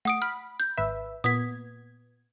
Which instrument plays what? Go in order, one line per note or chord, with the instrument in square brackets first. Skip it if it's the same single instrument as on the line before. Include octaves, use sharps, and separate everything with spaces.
[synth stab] A3 [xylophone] F#5 D#6 D7
[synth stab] B5 [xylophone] F6
[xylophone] G6
[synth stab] G#1 B4 E5
[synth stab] A#2 B3 G#6 [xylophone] D#6 B6